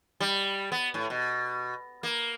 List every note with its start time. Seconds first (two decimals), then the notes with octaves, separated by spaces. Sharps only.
0.20 G3
0.72 B3
0.94 A2
1.10 B2
2.03 A#3